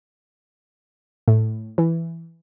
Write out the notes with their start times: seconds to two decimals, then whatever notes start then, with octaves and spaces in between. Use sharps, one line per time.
1.28 A2
1.78 E3